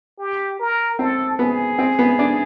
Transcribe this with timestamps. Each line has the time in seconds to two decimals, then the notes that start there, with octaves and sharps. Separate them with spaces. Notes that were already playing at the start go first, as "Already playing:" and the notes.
0.19 G4
0.59 A#4
0.99 C4 A4
1.39 B3 G#4
1.79 C4
1.99 B3
2.19 D4